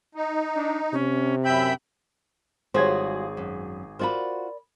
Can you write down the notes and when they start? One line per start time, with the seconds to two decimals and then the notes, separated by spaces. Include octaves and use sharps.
0.15 D#4
0.55 D4
0.93 C3 C#4
1.44 F#2 E5 G5 B5
2.74 G#1 G3 F4 F#4 G#4 C5 C#5 G#6
3.37 F#2
3.99 F4 F#4 A#4 C5 D5 B5